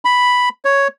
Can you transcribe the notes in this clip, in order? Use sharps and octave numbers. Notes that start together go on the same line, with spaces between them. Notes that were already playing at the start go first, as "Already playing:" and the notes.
B5
C#5